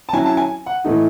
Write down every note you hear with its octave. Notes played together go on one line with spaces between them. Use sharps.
A5
F#3 C#4 E4 G#5
A5
G#5
F#5
A2 E3 A3 D#4